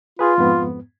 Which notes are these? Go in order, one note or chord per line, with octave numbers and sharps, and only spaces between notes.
F4 G#4 B4
F2 G#2 B3